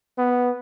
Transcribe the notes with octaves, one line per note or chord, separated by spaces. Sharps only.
B3